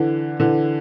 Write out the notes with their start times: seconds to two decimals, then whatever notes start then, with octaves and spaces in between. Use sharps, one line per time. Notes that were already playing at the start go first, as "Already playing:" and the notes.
Already playing: D3 E3
0.40 D3 E3